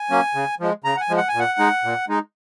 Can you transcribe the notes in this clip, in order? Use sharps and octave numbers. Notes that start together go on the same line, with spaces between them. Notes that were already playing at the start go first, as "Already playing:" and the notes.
Already playing: G#5
F#3 A#3 C#4
C#3
F3 G#3
C#3 A#5
F#5
G#5
F3 G#3
F#5
G#5
A#2
F#5
G#3 D#4
A#2
G#3 D#4